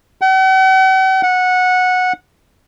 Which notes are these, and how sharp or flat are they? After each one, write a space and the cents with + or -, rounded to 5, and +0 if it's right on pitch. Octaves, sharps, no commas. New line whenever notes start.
F#5 +45
F#5 -15